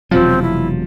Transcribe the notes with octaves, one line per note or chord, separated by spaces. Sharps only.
E1 C3 F3 F#3 C4
E4